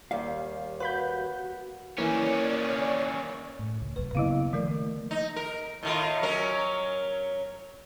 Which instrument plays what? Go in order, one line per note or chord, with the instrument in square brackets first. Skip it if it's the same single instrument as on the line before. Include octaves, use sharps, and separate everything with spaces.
[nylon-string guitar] D#2 G3 [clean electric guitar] F5
[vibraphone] F#4 F#5 [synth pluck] B4 B5 G6
[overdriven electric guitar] D#3 C#4 [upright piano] E3 A#3 [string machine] C#5 D5
[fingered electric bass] A2
C#2
[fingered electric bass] D1 C2 F#2 [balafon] B4
[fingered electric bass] C#3 A#3 B3 [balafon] F#3 E4 F5
[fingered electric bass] D#3 A3 A#3 [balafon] F3 A#4 D5
[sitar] D#4
A#4
A2 D#3 F4
F#3 C#4 A#4